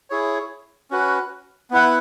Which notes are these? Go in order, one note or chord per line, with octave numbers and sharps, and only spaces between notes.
E4 G#4 C#5
C#4 F#4 B4
B3 E4 B4 F#5